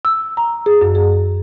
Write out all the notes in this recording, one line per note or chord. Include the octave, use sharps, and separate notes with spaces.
E6
A#5
G#4
F#2
G#4